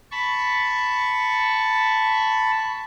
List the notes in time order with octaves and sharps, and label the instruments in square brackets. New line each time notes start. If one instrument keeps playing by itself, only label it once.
[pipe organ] A5 B5 C#6